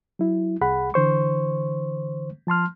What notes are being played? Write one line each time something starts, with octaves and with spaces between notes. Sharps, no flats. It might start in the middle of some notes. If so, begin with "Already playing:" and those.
F#3 E4
C2 G#4 F#5 B5
D3 E3 C5 C#6
F3 A5 C6 F6